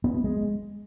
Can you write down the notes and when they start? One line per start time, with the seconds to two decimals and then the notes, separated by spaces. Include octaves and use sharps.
0.04 B3
0.14 B3
0.24 G#3